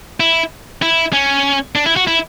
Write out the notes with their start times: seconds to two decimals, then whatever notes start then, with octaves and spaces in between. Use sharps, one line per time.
0.20 E4
0.82 E4
1.13 C#4
1.75 D4
1.86 E4
1.96 F#4
2.07 E4